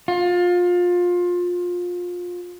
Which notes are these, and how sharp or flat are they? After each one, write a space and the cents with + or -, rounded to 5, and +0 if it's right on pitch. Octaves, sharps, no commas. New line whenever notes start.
F4 +25